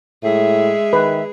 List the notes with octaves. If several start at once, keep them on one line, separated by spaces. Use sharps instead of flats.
A2 G#3 G#4 E5
D#3 B4